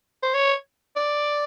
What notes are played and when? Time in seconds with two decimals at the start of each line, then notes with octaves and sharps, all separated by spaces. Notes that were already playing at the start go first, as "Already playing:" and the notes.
0.23 C5
0.34 C#5
0.96 D5